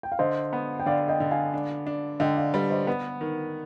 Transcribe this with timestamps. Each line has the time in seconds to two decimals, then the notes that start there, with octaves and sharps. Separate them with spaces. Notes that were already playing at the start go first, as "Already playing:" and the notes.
0.03 G5
0.12 F5
0.19 D3 C5 D#5
0.53 B3
0.80 G5
0.86 D3 D5 F5
1.08 D#5 G5
1.20 D3
1.31 F5 G#5
1.54 D4
1.87 D4
2.20 D3 D#5 G5
2.37 D5 F5
2.54 G3 B4 D5
2.70 C5 D#5
2.87 B3 B4 D5
3.21 D#3